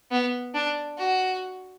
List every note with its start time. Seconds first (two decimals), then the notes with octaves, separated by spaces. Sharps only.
0.11 B3
0.54 D4
0.98 F#4